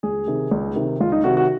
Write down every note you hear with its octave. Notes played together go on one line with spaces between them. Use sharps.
C#2 G#4
C3 D#3
C#2
C3 D#3
C#2 F4
D#4
C3 D#3 F#4
F#4